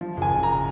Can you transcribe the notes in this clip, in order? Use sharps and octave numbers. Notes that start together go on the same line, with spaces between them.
F3
F#1 G#5
F#1
A#5